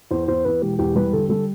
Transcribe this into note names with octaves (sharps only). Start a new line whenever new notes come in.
E2 C5
E2 C5
E2 B4
E1 G4
E2 G4
G3 B4
D3 A4
G3 A4